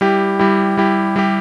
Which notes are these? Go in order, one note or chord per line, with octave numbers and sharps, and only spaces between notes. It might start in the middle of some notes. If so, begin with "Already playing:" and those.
G3 E4 G4
G3 E4 G4
G3 E4 G4
G3 E4 G4